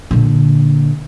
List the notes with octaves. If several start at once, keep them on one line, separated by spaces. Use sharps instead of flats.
A#2 D3